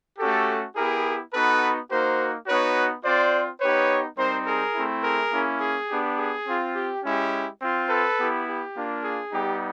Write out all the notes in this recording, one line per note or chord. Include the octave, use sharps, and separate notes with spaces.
A3 C#4 F#4 G4 A4
B3 E4 G4 G#4 A#4
B3 D#4 F#4 A4 B4
A#3 D#4 F#4 A#4 C5
B3 D#4 F#4 B4 C#5
C4 F4 C5 D5
B3 D#4 G4 B4 C#5
G3 C4 D#4 A#4 C5
G#4 A#4
A3 C4 E4
G#4 A#4
A#3 C#4 E4
G#4
B3 D4 G4
G#4
C4 F4
G4
G#3 C#4 E4 G4
C4 F4
A4 B4
B3 E4 G4
G4
A#3 D4 F4
G#4
G3 B3 D#4 G4